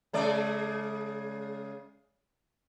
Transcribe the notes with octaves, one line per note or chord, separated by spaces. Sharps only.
C#3 G#3 D5